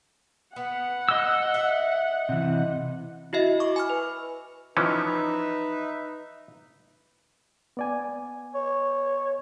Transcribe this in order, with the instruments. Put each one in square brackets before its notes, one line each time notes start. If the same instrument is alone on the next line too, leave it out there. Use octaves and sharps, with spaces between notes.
[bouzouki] B3 [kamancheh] F#5
[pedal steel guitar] D#5 E6
[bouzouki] E5
[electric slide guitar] C3 E3
[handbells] E4 F#4 D#5 E5
C#6 D6
G#5 B5 F6
B4
[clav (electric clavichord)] E3 F3 C#4 [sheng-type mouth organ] D#4 B4 E5
[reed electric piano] B3 D5 G#5
[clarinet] C#5